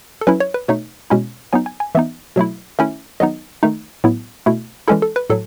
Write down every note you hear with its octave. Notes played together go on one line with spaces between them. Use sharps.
A4
F#3 C#4 E4 B4
C#5
B4
B2 A3 D#4 C#5
B2 G#3 C#4 E4
F#3 B3 D#4 G#5
G#5
G#5
E3 B3 D#4 E5
B2 F#3 A3 E4
D#3 A3 C#4 E4 E5
D#3 F#3 B3 D#4 D#5
D#3 A3 D#4
A2 F#3 B3 E4
B2 A3 E4
E3 G#3 C#4 E4 A4
A4
B4
A2 F#3 A4